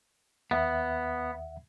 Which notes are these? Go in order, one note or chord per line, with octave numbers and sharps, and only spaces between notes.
D#2 B3 E5 F#5